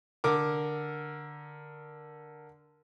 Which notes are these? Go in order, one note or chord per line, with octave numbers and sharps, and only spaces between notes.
D3 A#4 D6